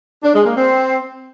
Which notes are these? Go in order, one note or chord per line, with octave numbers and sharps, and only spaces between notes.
D4
G#3
A#3
C4